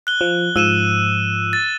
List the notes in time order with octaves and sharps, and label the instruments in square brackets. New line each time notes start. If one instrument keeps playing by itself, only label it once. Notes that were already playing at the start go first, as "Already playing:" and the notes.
[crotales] F#6 G7
[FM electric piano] F3
[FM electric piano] G#2 F3 [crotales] E6 D#7 E7
[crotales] A6